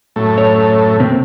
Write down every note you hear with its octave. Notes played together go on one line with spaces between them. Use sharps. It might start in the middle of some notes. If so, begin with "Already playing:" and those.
F#2 A2 A3
C#5
C3 A#3 C4